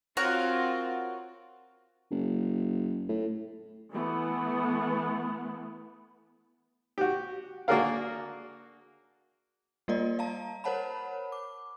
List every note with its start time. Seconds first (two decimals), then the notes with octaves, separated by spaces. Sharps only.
0.17 C4 F4 F#4 A#4 C#5
2.11 F#1
3.09 A2
3.93 E3 A3 B3
6.98 F#4 G4
7.68 A#3 D4 F#4 G#4 A#4 F5
9.88 G3 A#3 F4 A#4 D5 D#5
10.19 F5 A5 A#5
10.64 A#4 C5 C#5 F#5 A5 B5
11.32 D6